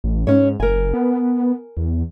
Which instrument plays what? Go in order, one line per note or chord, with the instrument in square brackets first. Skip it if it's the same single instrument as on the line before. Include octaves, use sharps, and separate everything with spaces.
[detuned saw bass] A1
[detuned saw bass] G#2 [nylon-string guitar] C#4 C#5
[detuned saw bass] F#1 [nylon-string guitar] A#4 G#5
[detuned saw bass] B3
E2